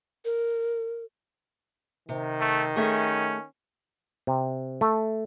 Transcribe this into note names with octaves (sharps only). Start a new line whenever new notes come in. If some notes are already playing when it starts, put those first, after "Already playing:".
A#4
C3 D#3
A3
A3 C#4 G#4 E5
C3
A3